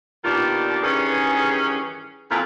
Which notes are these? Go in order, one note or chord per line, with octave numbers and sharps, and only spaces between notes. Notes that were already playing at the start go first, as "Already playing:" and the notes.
B2 D#3 A#3 D4 F4 G4
G2 D#3 E3 C#4 G#4
F2 A#2 E4 F4